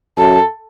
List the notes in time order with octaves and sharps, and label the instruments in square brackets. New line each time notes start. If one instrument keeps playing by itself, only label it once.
[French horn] F#2 [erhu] A4